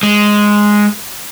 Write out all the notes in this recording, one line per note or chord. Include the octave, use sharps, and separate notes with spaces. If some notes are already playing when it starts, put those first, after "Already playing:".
G#3